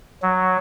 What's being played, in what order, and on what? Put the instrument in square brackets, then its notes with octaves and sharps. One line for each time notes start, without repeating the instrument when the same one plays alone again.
[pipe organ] F#3